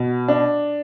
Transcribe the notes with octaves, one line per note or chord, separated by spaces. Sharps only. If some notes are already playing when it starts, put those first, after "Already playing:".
Already playing: B2
D4